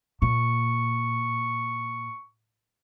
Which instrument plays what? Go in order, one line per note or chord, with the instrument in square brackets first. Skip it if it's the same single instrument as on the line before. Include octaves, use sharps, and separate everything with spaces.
[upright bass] A#2 [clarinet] C#6